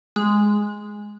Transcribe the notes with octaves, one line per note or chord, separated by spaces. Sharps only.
G#3